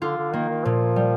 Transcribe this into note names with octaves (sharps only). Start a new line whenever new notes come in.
D3 F4
D3
D#3 A#3
D#3
A#2 F3
G3